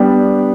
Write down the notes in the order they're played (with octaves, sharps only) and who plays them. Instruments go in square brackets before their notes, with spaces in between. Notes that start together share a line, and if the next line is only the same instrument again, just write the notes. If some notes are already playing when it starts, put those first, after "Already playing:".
Already playing: [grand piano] G3 B3 D4 G4